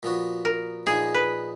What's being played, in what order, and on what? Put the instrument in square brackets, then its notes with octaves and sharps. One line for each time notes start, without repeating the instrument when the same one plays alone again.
[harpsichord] A#2 F3 B3 F#4
[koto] A#4
[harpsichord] A#1 A#2 F3 B3 D#4 [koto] G#4
[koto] B4